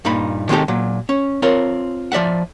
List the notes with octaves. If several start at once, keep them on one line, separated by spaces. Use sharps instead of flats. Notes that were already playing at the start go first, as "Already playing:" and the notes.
G2 A#2 D#4 B5
D#3 G#3 C4 D#4 G4 A4
A#2 F#3
C#4
C4 F4 A#4 C#5
F3 D5 E5 F#5